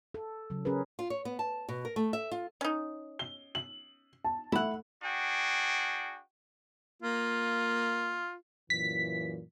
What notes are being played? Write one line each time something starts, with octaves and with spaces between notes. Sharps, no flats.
A4
C#3 F#3
C#4 G#4 A#4 B4
F4
C#5
B3
A5
B2
A#4
A3
E5
F4
C#4 D#4
G7
F#7
A5
A3 E4 F#5
D4 F#4 G#4 G5
A#3 F4
F#2 A#2 E3 B6